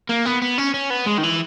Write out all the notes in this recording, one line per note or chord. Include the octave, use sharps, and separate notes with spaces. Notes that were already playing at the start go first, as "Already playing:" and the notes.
A#3
B3
B3
C#4
C#4
B3
G#3
D#3
E3